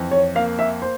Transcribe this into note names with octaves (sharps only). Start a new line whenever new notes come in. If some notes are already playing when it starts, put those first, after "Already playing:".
Already playing: F2 E3
C#5
A#3 F5
E5
C5